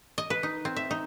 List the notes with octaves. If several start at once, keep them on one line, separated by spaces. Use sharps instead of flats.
D#5
B4
D#4
C4
E5
D#4